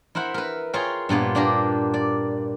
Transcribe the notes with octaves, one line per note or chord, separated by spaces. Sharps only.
E4 A#4 C5 F#5 B5
A#4 B4
F4 G#4 A#4 C#5 F5 G5
G2 A#2 B3 F4
A#3 D4 G4 A#4 A#5
D5